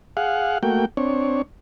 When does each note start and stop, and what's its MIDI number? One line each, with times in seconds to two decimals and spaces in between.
0.17 0.58 68
0.17 0.58 77
0.17 0.58 78
0.63 0.85 57
0.63 0.85 58
0.63 0.85 66
0.63 0.85 79
0.97 1.42 60
0.97 1.42 62
0.97 1.42 73